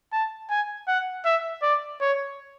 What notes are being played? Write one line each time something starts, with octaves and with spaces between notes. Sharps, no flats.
A5
G#5
F#5
E5
D5
C#5